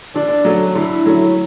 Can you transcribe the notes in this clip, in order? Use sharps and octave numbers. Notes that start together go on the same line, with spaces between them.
D3 D4
F#3 A3 C#4
D3 E4
F#3 A3 C#4